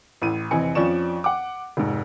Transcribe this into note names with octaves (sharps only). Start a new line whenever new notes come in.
A1 A2 D#7
F1 E3 C4 D#5 G#5 C#7
F2 F3 C#4 D5 C#6 E7
F#5 D6
F1 G#2